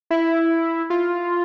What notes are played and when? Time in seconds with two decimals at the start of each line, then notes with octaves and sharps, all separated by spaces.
0.11 E4
0.90 F4